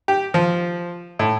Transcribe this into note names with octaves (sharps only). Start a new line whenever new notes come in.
G4
F3
A2